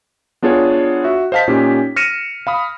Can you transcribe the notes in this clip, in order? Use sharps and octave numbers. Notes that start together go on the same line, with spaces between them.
B3 D4 F4 G#4 C#5
F#4 E5
C5 D#5 F5 A5 B6
A#2 C#4 D#4 G4
F6 A#6 C#7 D#7 E7
F5 B5 D#6